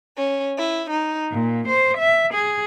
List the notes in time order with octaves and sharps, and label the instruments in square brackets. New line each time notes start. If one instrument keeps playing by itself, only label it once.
[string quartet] C#4
E4
D#4
A#2
C5
E5
G#4